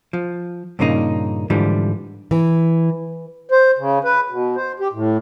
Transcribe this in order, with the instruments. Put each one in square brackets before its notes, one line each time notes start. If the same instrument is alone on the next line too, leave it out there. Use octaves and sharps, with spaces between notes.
[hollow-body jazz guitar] F3
G2 A#2 C#3 A#3 D#4
G#2 D3 E3 F3 G3
[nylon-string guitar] E3
[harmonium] C5
C#3
B4
B2
C5
G4
A2